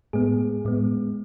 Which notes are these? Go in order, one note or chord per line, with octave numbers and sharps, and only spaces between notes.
A2 G#3 B3 G#4
A2 G#3 B3